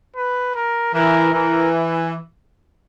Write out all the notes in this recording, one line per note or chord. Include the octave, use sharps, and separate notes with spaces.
B4
A#4
E3 A#4
E3 A#4